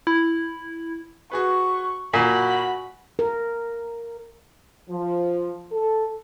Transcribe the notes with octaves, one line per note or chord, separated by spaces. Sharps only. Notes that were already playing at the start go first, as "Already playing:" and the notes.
E4
F#4 G#4 B4 C#6
A#2 F#4 G#5 B5
A#4
F3
A4